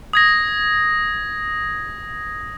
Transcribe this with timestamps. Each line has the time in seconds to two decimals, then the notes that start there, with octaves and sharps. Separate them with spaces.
0.13 D#6 G#6 A#6